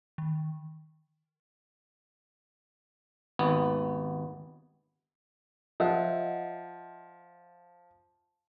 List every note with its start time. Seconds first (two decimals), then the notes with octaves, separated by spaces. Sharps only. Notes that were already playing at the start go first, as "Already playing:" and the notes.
0.18 D#3
3.39 G#1 D#2 B3
5.80 F3 D#5 E5 F#5